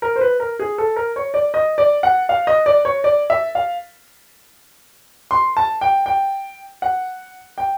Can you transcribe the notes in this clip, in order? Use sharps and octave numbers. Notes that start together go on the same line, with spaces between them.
A#4
C5
B4
A#4
G#4
A4
A#4
C#5
D5
D#5
D5
F#5
F5
D#5
D5
C#5
D5
E5
F5
C6
A5
G5
G5
F#5
G5